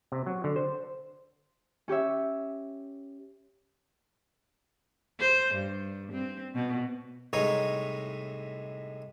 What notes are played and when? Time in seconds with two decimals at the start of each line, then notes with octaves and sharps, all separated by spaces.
0.12 C3
0.26 F#3
0.44 D3
0.56 C5
1.88 C#4 G4 C#5 E5
5.20 C5
5.54 G2
6.12 C4
6.55 B2
7.33 C2 A2 G#3 D#4 C#5 D#6